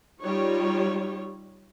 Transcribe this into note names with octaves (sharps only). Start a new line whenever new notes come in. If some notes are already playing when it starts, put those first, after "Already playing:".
G3 D#4 F4 C#5